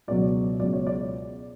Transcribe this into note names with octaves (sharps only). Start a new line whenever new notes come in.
C#2 B2 F#3 D5
C#2 B2 F#3 D5
C#5
D5